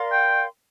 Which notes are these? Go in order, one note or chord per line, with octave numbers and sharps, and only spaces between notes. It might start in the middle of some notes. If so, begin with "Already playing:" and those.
Already playing: A#4 D5 F5 C6
G5